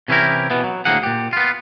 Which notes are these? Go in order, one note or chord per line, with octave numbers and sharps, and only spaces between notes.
C3 E3 C#4 E4 G4 A#4
B2 E3 B3
F#3
D2 A2 E3 A#3 G#4 F#5
A#2 G4
B3 F4